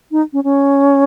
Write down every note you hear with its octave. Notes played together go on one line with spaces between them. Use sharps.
D#4
C#4
C#4